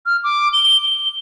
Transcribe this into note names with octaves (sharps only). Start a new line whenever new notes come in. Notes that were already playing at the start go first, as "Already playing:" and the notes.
F6
D6
G7